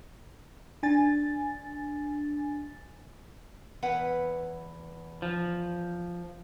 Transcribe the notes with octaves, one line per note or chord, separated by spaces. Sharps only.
D4 G#5 A6
E2 B4 F#5
F3